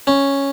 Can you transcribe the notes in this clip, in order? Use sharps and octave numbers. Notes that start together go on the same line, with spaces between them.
C#4